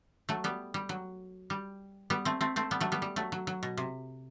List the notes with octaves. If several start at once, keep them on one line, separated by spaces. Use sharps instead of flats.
F#3 A3
G3 B3
G3
F#3
G3
G3 B3
A3 C4
A3 C4
A3 C4
G3 B3
F#3 A3
G3 B3
G3
F#3 A3
F#3
F#3
B2
C3